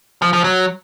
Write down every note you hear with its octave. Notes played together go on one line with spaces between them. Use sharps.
F3
F3
F#3